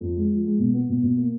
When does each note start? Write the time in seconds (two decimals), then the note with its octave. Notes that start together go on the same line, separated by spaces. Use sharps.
0.01 F2
0.16 G#3
0.31 F3
0.44 G#3
0.59 B2
0.74 B3
0.89 B2
1.02 B2
1.16 A#3